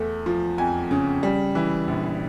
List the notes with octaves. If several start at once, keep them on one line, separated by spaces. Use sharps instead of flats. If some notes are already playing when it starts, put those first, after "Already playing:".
Already playing: E2 A3
F3
F2 G#5
C#3
G3
E3
A#1